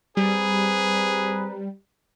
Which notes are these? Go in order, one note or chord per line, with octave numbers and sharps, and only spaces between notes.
G3 C4 G#4 A#4 B4